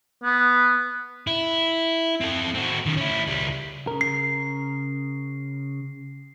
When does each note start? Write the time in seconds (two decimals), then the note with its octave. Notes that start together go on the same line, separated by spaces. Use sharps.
0.24 B3
1.27 E4
2.21 C4 A4
2.55 C4 F#4
2.86 D#3 C#4
2.97 C#4 E4
3.27 C#2 G3
3.87 C#3 A#4
4.01 C7